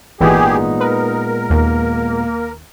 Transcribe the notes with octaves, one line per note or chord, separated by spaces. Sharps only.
G#1 A#2 E3 G#3 B3 D#4 G4 G#4
A#4 B4
D#2 A#3